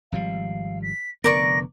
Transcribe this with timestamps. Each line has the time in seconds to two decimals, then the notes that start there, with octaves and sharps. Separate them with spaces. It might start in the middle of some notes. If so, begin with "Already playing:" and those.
0.12 G#1 F3 G3 F5
0.82 B6
1.24 F1 D3 B3 A#4 D5 C#6 A#6